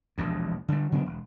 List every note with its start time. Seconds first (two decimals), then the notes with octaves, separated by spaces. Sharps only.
0.18 E1 A#1 D#2
0.68 D3 G3
0.92 C#3 F#3 B3 D4
1.06 E1